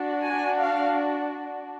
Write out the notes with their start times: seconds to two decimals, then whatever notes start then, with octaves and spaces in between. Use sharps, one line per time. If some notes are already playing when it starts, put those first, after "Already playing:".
Already playing: D4 F#4
0.24 G#5
0.58 F5